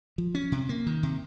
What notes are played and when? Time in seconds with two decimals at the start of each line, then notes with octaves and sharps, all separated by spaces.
0.18 F3
0.35 C#4
0.52 C3
0.69 A#3
0.87 D#3
1.03 C3